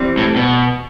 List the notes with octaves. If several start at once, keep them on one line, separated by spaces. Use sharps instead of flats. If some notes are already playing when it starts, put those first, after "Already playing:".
Already playing: E3 G3 C4
A2
B2